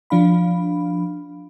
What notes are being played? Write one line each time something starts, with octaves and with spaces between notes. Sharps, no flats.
F3 D4 F5 B5